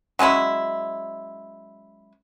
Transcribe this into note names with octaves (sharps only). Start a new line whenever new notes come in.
F#3 G#3 C#4 E4